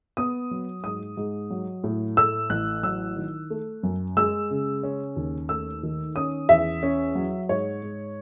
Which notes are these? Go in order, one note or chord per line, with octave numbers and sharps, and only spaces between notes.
B3 D#6
F#3
G#2 D#6
G#2
F#3
A2
A3 E6
A1 F#6
F#3 E6
D#3
A3
F#2
G#3 E6
C#3
C#4
D#2
A3 E6
D#3
C#4 D#6
E2 E5
C#4
F#3
G#2 C#5
G#2